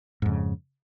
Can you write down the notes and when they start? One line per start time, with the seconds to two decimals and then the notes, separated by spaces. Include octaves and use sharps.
0.22 G#2
0.25 F2
0.29 C#3